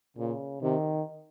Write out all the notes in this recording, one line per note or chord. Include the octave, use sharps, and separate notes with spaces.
A#2 C#3
C3 D#3